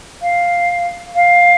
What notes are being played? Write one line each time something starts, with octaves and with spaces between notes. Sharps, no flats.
F5
F5